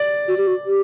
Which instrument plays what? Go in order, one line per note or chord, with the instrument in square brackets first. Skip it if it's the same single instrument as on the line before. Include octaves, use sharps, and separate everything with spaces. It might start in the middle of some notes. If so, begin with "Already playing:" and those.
Already playing: [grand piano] D5
[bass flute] F#4
G4
F#4
G4